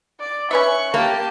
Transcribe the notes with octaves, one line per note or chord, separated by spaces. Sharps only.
D5
C#4 B4 E5 C#6 F#6
A#3 G4 A5